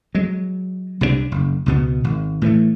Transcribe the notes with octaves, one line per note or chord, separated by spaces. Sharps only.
F#3 G#3
C2 C3 E3 D4
F#1
C#2 B2 B3
G#1
A2 E3 F#3 A3